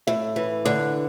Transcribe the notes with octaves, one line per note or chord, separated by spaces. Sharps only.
A2 E5
E3
D3 D5